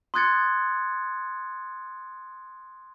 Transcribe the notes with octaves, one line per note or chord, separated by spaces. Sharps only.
C6 D#6 F#6 G#6 A6 C#7